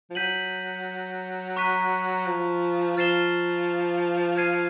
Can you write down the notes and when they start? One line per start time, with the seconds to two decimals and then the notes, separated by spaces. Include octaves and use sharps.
0.10 F3
0.15 F#3 G6 B6 D#7 F#7
1.56 A#5 C#6 F#6 B6 D#7
2.26 F3
2.97 F3 F6 A6 C7 E7 G7
4.37 F6 G#6 C7 D#7